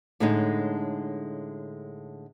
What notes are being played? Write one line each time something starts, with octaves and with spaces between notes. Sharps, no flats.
A2 D3 G#3 C#4 D#4